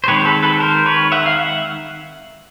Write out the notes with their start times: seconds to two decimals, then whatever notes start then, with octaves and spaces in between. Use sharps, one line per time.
0.04 C5
0.08 D#3 G#3 C4 B4 C#5
0.20 C5
0.25 A4 B4
0.42 A4 B4
0.60 A#4 C5
0.86 B4 C#5
1.12 E5 F#5
1.26 F5
1.37 E5 F#5